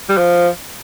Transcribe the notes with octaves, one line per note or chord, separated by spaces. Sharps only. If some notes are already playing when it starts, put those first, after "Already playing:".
G3
F3